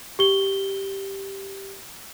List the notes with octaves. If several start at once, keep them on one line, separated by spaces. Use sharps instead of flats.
G4 G7